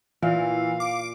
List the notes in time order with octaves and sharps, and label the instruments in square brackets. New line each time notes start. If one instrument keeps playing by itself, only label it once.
[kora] A#2 [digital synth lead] E3 [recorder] F5
[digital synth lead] D6